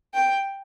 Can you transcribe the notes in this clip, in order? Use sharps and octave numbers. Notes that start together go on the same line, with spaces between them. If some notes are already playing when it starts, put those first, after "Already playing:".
G5